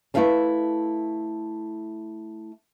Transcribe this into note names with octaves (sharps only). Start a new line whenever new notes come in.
A3 E4 B4 E5 F5 A5